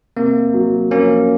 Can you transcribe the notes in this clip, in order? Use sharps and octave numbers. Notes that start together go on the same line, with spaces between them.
C3 A#3
F#3
F3 A#3 C#4